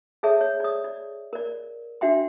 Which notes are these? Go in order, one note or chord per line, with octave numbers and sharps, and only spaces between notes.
G#4 A4 C#5 D5 E5 A5
C#5
D5 D#6
D5
A#4 D5
D4 F#4 E5 G5 C6